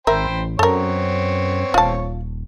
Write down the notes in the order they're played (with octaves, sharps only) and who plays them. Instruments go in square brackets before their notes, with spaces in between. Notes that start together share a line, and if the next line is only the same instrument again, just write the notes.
[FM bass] G#1 [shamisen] A#4 E5 [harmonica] C5 G5 B5
[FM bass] A1
[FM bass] F#2 [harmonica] B3 C4 C#5 [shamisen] A4 A#4
[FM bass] D#1 [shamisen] F4 A5